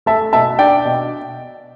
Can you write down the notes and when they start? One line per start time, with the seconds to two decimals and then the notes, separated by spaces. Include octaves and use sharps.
0.06 A3 E5 A5
0.33 B2 E5 A5
0.59 D4 D5 G5
0.85 B2